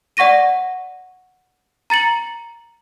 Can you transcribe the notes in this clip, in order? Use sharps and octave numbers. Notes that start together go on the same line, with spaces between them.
D5 F#5 C#6 A#6 D#7
A#5 A6 C#7 F#7